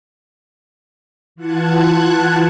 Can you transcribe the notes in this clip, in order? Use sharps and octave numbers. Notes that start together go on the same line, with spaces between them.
E3 F4 F#5 A5 F#6 G#6